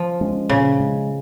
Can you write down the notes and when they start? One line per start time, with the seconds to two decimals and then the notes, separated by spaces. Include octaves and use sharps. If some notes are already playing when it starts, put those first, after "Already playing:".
Already playing: F3
0.21 G#3 C#4
0.50 A#2 C#3
0.80 G#3 C#4